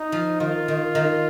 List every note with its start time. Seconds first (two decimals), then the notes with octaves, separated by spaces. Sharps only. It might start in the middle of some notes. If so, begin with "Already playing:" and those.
Already playing: D#4
0.12 F3
0.40 D#3 F4
0.68 D#3
0.95 D#3